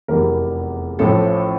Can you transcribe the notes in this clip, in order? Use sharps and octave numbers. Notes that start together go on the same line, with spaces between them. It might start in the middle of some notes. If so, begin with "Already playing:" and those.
F1 E2 E3 G3 A#4
A1 A2 F3 A4